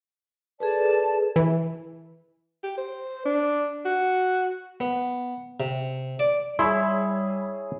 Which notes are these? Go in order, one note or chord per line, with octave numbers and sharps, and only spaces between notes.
G#4 A4 B4 D5 A5
E3
G4
C5
D4
F#4
B3
C3
D5
G3 E4 G#4 C#5 E5 B5 C6